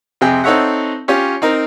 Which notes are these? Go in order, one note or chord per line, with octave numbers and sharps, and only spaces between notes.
F2 C3 G#4 G5
C4 D#4 A4 C#5 E5 F#5
C#4 F4 G4 C#5
C4 D#4 A#4